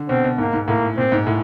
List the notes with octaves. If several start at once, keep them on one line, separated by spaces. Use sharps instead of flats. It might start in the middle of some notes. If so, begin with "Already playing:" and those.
Already playing: D3
B2 C4
B2
G#2 A#3
G#2
A2 A#3
A#2 C4
G#2
A2